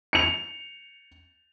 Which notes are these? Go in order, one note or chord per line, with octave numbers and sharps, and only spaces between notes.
C#7 F7